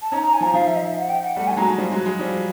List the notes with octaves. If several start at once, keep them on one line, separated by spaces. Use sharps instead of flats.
A5
C#4 D#4 A#5
A#5
G#5
F3 A#5
F3 F5
E5
D#5
E5
F#5
G5
F#5
G3 A3 F#5
G#5
A3
F#3 G#3 A#5
F3 G3
F#3 G#3
F#3 G#3
F3 G3